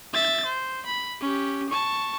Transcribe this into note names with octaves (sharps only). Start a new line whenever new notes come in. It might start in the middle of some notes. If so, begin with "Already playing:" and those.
E5 A6
C5
B5
C#4 G4
A5 C#6